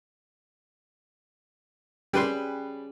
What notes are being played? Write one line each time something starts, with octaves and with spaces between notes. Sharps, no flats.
G3 C#4 G4 G#4 B4 C6